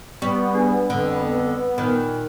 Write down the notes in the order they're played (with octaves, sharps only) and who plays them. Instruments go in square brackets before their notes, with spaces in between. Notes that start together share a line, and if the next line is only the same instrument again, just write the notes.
[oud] G3 [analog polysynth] B3 [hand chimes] C#6
[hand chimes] D4 [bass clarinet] G#4
[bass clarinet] F2 [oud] D3
[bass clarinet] A#2 [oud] D#3 [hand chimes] B5 F#6